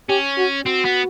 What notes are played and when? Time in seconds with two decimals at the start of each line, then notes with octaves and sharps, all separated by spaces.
0.09 C#4 G4
0.37 F#4
0.66 C4 F#4
0.85 B3